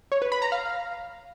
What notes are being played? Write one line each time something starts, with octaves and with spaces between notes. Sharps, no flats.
C#5
B4
B5
A#5
F5